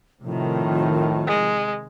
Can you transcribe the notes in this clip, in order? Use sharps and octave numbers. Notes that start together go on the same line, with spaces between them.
A2 C3 D#3 F3
G#3